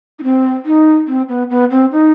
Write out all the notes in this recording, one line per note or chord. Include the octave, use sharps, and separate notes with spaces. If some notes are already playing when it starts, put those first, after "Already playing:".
D#4
C4
D#4
C4
B3
B3
C4
D#4